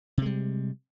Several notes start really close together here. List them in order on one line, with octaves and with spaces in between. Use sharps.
C3 G#3 G3